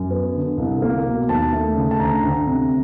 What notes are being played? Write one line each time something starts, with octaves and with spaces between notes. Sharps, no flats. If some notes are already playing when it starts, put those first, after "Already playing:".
Already playing: F#2
B3
D3
C2
A#3
B2
D#2 A5
A3
C#3
A5
D2 A#5
D2
C3